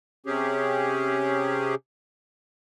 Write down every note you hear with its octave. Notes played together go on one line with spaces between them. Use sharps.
C3 C#4 G4 G#4